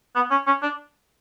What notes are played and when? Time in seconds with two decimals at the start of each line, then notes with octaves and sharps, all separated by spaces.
0.15 B3
0.31 C#4
0.47 C#4
0.62 D4